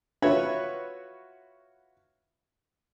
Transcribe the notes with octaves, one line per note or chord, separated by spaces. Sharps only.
F4 F#4 B4 C#5 E5